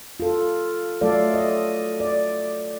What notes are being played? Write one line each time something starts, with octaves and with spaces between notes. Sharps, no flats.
F4 A4
F#3 A3 F4 A4 D5 F5
D#5
D5